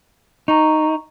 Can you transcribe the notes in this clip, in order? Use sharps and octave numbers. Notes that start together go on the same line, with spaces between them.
D#4 A#5 C#6